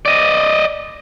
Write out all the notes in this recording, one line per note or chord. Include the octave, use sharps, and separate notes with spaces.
D5 D#5